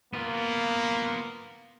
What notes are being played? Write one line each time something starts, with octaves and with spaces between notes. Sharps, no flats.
A#3 B3 F4